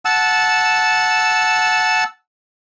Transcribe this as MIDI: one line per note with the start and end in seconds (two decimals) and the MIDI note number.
0.05 2.04 78
0.05 2.04 81
0.05 2.04 88